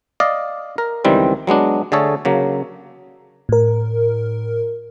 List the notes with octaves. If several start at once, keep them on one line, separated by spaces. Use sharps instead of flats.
D5 D#5 F5
A#4
C#2 D#3 E3 G3 C4
F#3 G#3 B3 D4
D3 A3 G#4 A4 C#5
C#3 F#3 A#3
A2 A#4